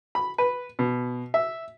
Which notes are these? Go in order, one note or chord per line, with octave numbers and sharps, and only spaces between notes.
B5
B4
B2
E5